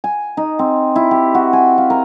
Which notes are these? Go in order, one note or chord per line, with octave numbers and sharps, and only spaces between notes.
G#5
D#4
C4
E4
G4
F#4
G#5
F5
A#4